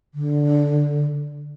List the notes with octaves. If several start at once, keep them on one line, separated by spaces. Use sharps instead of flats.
D3